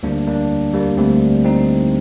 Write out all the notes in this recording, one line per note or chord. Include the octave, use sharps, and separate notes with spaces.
D2 D3 G3 A#3 D4
A#3 D4
G3 A#3
D2 D3 G3 A3 C4
C4 D#4